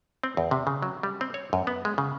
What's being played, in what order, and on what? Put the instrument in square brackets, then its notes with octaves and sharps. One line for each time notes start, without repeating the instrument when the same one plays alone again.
[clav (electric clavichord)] C4
E2
C3
C#3
F#3
G3
C4
C#5
F#2
B3
G#3
C#3